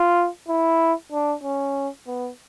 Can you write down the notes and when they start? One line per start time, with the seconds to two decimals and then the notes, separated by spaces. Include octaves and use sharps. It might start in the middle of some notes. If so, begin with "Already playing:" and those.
Already playing: F4
0.48 E4
1.12 D4
1.43 C#4
2.07 B3